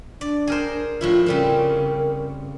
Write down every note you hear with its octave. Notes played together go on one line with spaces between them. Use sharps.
D4 D5
G#4 A#4 C5
A2 F3 E4 F4
C#3 G3 C4 A#4